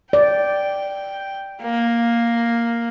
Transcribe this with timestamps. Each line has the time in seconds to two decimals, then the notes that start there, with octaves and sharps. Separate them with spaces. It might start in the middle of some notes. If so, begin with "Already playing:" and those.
0.13 D5 G5
1.62 A#3